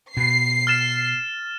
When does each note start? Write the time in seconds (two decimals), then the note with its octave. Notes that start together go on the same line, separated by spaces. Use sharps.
0.17 B2 C7
0.67 F6 A6 E7